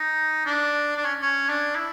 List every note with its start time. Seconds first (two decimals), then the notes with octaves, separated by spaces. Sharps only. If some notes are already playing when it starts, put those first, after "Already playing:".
Already playing: D#4
0.46 D4
0.97 D4
1.05 C#4
1.21 C#4
1.49 D4
1.75 E4